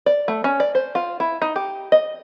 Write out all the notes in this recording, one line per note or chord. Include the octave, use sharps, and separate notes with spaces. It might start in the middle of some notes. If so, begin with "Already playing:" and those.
D5
A3
C#4
D5
C5
F4
E4
D#4
G4
D#5